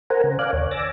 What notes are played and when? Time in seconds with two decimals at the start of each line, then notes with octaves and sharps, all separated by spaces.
0.10 A#4 C5 F#5 G#5 A#5
0.24 C#3
0.39 D5 F5 G#5 D6 F#6
0.53 D#2 C#5
0.71 G#5 D6 E6 A6 A#6